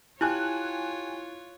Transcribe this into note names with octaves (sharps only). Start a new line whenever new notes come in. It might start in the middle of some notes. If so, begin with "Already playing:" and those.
E4 F4 G4 C#5 G#5 F#6